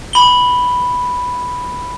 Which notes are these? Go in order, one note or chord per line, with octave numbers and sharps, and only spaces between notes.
B5 G7